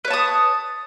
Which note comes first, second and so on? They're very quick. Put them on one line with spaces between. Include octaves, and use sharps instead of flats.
B4 C#5 A5 D#6